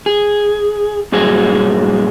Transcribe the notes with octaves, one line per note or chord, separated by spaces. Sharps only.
G#4
G2 A#2 F#3 G#4